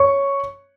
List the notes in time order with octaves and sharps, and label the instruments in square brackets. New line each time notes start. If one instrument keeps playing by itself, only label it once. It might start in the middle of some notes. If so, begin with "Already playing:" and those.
Already playing: [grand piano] C#5 C#6